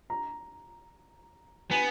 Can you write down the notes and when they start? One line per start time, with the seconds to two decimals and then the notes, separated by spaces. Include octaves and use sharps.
0.10 A#5
1.71 B3 G#5